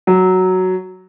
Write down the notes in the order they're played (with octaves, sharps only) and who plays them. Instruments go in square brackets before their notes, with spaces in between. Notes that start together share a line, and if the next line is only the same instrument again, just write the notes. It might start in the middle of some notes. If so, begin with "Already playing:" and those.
[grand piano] F#3